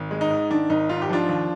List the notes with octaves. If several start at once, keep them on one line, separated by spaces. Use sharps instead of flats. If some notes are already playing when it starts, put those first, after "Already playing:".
Already playing: G#1
G#3
D#4
G#2
D#3 D4
G#1 D#4
G#2 F4
G4
F3 D4 F4
D#2